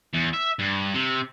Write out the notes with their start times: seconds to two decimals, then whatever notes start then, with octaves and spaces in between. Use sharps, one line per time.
0.14 E2
0.34 E5
0.59 G2
0.94 C3